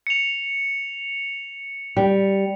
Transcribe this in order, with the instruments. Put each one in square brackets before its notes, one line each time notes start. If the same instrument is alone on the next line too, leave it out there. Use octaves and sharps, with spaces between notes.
[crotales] C#7 F7
[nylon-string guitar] G3